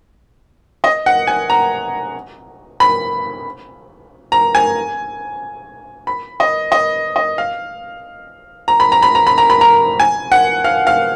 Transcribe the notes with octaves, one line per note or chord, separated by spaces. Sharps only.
D#5
F#5
G#5
A#5
B5
A#5
G#5
B5
D#5
D#5
D#5
F5
A#5
B5
A#5
B5
A#5
B5
A#5
B5
A#5
G#5
F#5
F5
F5